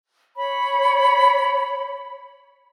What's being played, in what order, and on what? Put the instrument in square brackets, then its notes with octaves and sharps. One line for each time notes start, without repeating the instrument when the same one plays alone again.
[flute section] C#5 B5